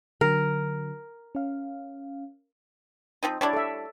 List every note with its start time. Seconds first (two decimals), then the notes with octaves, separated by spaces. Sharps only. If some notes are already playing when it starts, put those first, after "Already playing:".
0.21 D3 F#3 A#4
1.35 C#4 F5
3.23 F3 C4 D#4
3.41 G3 D4 E4 C#5 D5
3.53 A4 E5